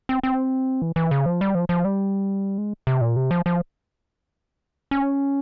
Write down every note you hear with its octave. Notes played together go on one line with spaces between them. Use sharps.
C4
C4
E3
E3
C#3
F3
G3
F3
F3
G3
G#3
C3
A#2
C3
F3
F3
C#4